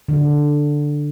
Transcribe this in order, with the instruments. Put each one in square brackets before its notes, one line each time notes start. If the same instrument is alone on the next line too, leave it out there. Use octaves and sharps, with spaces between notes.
[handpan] D3